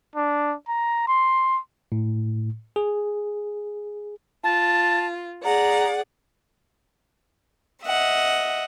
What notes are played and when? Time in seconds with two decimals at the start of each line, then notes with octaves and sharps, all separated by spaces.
0.16 D4
0.68 A#5
1.07 C6
1.92 A2
2.76 G#4
4.44 F4 A5
5.45 G#4 D5 F#5 A#5
7.85 D#5 E5 F#5